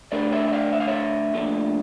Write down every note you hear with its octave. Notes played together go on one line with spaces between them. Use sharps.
D3 A3 D4 A#4 D5
C#5 E5
E5
D5 F5
E5
F5
C#5 E5
A#2 F3 A3 D4